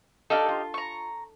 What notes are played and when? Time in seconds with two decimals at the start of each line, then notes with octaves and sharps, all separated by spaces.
0.30 D4 D#4 G4 A4 F5
0.48 F4
0.74 A#5 C#6